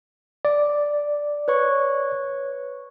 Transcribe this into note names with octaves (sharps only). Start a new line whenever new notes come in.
D5
B4 C#5 C#6